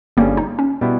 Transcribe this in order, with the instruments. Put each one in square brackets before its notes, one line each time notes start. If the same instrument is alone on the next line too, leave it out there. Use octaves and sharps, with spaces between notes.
[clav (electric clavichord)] G1 G2 G3 C#4 G#4 [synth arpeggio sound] A#3
[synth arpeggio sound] D#4
C#4
[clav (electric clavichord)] B2 G3 B3 E4